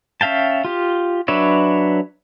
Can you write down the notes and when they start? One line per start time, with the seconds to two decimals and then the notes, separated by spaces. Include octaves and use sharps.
0.21 C#4 E5 F5 G5 A5
0.65 F4 G4
1.28 F#3 D4 B4 C#5 E5